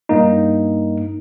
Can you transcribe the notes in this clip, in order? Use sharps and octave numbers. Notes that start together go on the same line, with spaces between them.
G2 A#3 D#4